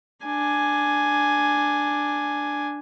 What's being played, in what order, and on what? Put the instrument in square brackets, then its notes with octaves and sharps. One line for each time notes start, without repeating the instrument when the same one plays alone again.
[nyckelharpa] D4 G#5